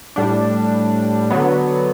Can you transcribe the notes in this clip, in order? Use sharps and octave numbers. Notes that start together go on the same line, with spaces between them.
A2 G3 D4
D3 F#3 B3